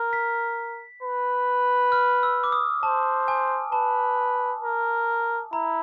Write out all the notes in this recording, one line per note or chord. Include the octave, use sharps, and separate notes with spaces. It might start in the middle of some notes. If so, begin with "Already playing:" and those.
Already playing: A#4
B6
B4
F6
E6
D6
D#6
C5 A5
G#5
B4 A5
A#4
E4 A#5